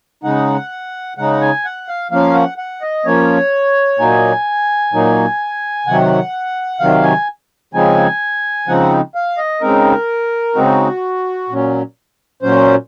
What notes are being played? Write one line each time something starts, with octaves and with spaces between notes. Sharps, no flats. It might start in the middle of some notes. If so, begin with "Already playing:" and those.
C#3 G#3 D#4 F#5
C#3 G#3 D#4 F#5
G#5
F#5
F5
F3 A#3 C#4 F5
F#5
F#5
D#5
F3 A#3 C#4 C#5
A#2 F#3 A#3 D#4 G#5
A#2 F#3 A#3 D#4
C3 D#3 F#3 F#5
C3 D#3 F#3 F5
G#5
C#3 F3 G#3 C4 D#4 G#5
C#3 F3 G#3 C4 D#4 F#5
F5
D#5
C#3 G#3 C4 D#4 A#4
C#3 G#3 C4 D#4 F#4
A#2 F#3 C#4
A#2 F#3 C#4 C5